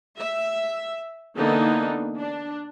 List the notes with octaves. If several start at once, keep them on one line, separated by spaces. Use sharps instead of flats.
E5
D3 E3 A#3 B3 D#4
D4